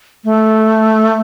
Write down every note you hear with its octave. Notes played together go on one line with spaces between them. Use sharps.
A3